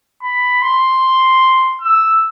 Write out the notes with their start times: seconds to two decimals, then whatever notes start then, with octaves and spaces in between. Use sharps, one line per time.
0.23 B5
0.62 C6
1.81 E6